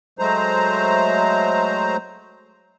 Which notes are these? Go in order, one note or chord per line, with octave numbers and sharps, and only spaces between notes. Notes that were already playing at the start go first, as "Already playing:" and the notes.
F#3 G#3 A3 C5 A#5